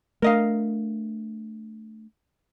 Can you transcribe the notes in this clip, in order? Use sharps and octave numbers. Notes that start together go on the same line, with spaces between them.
A3 D4 A#4 D#5 F5